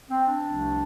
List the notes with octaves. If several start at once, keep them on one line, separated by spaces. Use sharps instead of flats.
C4
D4
C2 C3 F3 A3